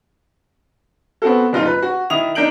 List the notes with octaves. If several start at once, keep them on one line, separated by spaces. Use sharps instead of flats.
B3 C4 F#4 A4
F#1 D#4 F4
B4
F#4
D#3 E4 D#6 F7
D4 D#4 A#4 G6 D7 F#7